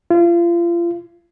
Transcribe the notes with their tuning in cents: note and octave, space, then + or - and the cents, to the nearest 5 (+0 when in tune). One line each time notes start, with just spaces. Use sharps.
F4 -35